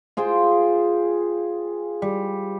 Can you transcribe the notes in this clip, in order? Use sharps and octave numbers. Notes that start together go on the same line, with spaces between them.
F4 G#4 C5 G5
G3